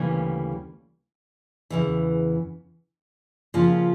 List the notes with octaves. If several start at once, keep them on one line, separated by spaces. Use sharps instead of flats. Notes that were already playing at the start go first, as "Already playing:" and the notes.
Already playing: D2 C#3 E3 G3 A#3
E2 C#3 E3
C#3 F3 A#3 C#4 F4